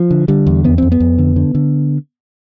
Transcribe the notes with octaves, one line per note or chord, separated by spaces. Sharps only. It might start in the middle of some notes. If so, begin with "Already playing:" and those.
Already playing: F3
D3
D3 G3
E2
F2 B3
F2 C4
B3
F2
D3
D3
D3